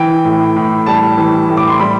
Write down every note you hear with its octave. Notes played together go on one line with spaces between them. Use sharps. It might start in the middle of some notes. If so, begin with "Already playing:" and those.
Already playing: E3 G5
A2
A2
G3 A5
E3
A2
D6
C6
G3 B5